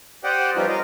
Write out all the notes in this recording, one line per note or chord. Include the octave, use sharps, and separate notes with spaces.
G4 C5 D5 D#5 F#5 G5
F3 G3 B3 C#4 D#4 F4
A#4 D#5 F5